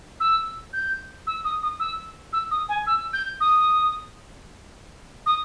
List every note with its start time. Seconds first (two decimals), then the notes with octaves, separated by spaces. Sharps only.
0.20 E6
0.73 G6
1.27 E6
1.44 D#6
1.62 D#6
1.79 E6
2.33 E6
2.51 D#6
2.68 G#5
2.86 E6
3.13 G6
3.40 D#6
5.26 D#6